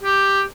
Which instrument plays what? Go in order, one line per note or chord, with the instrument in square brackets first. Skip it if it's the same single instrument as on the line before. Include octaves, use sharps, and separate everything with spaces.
[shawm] G4